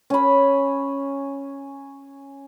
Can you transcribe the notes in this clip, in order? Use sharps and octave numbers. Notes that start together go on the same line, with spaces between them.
C#4 B5